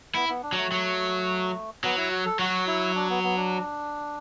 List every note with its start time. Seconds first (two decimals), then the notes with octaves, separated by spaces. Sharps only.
0.15 B3 E4
0.29 B3
0.43 D4
0.53 F#3 A3
0.72 F#3
1.83 F#3 B3
1.97 E4
2.11 F#4
2.25 A4
2.39 F#3 F#4
2.67 E4
2.95 D4
3.09 B3
3.24 B3
3.37 D4